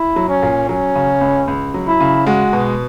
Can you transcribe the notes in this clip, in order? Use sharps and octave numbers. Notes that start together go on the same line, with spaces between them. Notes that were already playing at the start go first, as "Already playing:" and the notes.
Already playing: E4
F#3
C#4
A#2
F#3 C#4
C#3
C#2
C#2
F#3
E4
C#3
G#3 F#4
B2